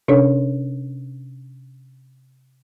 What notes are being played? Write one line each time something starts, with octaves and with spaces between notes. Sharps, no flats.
C3 C#4 D4 A4 C#5